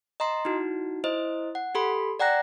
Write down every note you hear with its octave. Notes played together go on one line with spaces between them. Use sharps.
D#5 A#5 C6
D#4 E4 F#4
E4 C5 D#5
F#5
G4 A4 B5 C6
D5 F#5 G5 A#5 F#6 A#6